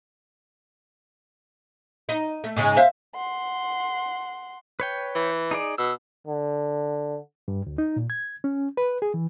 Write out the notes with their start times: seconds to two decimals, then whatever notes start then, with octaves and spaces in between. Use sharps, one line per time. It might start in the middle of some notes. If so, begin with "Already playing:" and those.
2.09 D#4
2.44 A3
2.56 G#2 C#3 G#3
2.76 C5 E5 F5
3.16 F#5 C6
4.80 B4 C#5 G5
5.15 E3
5.51 D#4 G#4 D5
5.78 B2 E6
6.27 D3
7.48 G2
7.67 D2
7.78 D#4
7.96 A#2
8.10 G#6
8.44 C#4
8.77 B4
9.02 G#4
9.14 E3